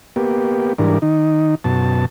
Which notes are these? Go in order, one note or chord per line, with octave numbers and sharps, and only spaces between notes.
A#3 B3 G4
G#2 E3 G3 D4 A#4
D#3 D#4
F#2 B2 A5